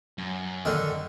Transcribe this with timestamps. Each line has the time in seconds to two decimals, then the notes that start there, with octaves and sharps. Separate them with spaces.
0.18 F#2
0.65 D3 D#3